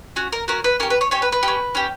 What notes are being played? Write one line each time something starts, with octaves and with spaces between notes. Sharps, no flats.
C#4 F#4
A#4
C#4 F#4 A#4
B4
C#4 G4 A#4
B4
C#5
C#4 G4 C#5
B4
B4
C#4 G4
C#4 G4